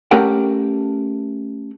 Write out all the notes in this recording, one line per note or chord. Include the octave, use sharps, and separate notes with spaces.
A3 C#4 G4 A#4 F#5 G5